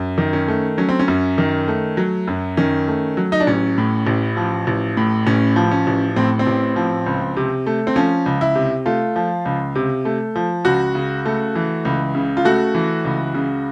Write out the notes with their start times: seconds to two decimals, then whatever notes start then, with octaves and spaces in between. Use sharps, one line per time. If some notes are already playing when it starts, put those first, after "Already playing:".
Already playing: F#2
0.18 D#3
0.33 C#4
0.48 A3
0.78 F#3 C#4
0.89 C4
0.99 C#4
1.08 F#2
1.38 D#3
1.68 A3
1.97 F#3
2.27 F#2
2.57 D#3 C#4
2.88 A3
3.17 F#3
3.32 D#4
3.40 D4
3.47 A1 C#4
3.78 A2
4.07 A1
4.37 F3
4.67 A1
4.97 A2
5.27 A1 C#4
5.56 F3
5.71 C#4
5.87 A1
6.16 A2 C4
6.39 C4
6.46 A1
6.76 F3
7.06 C#2
7.37 C3
7.66 A3
7.87 C4
7.96 F3 C#4
8.26 C#2
8.41 E4
8.55 C3
8.86 A3 F4
9.16 F3
9.45 C#2
9.75 C3
10.05 A3
10.35 F3
10.65 C#2 F#4
10.95 C#3
11.25 A3
11.55 E3
11.85 C#2
12.15 C#3
12.37 F4
12.45 A3 F#4
12.75 E3
13.05 C#2
13.34 C#3